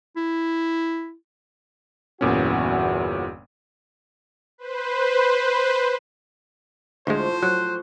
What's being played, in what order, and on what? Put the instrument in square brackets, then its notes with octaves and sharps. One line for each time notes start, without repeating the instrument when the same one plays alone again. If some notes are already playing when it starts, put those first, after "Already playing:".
[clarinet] E4
[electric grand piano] G1 A#2 C#4 [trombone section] E2 F#4
[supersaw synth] B4 C5
[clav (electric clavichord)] D2 G#3 [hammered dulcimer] A2 F3 C#6 [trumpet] C5
[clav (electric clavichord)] F#3 [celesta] F#6